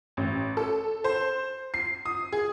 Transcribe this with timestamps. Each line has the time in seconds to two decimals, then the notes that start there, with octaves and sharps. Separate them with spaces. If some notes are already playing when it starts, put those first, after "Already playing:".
0.17 A1
0.57 A4
1.04 C5
1.74 C7
2.06 D#6
2.32 G#4